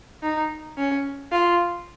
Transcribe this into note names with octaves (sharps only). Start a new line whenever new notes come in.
D#4
C#4
F4